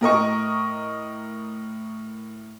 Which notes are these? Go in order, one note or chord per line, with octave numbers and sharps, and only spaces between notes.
A2 A#4 D#5 C#6